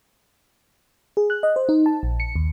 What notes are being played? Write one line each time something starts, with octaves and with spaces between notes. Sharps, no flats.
G#4
F#6
D#5
C5
D#4
A5
A#1
C#7
D#2